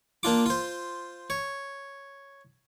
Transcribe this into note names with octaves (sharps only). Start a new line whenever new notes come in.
A#3 D4 F4 D6
F4 C5
C#5